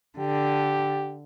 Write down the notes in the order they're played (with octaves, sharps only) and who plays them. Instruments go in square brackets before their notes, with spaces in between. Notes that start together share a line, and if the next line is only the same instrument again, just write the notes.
[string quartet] D3 [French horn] G4